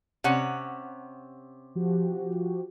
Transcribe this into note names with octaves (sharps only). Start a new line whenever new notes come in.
C3 C#4 F#5
F3 F#4 G4